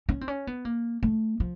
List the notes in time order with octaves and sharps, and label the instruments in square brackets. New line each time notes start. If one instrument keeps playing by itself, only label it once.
[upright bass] C#4
C4
C#4
B3
A#3
A3
F3